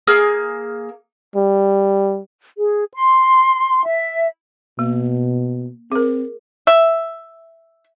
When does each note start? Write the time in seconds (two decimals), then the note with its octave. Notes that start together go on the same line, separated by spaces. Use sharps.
0.07 A#3 G#4 F6
1.36 G3
2.58 G#4
2.92 C6
3.85 E5
4.79 B2 A#3
5.92 C4 G#4 A#4
6.67 E5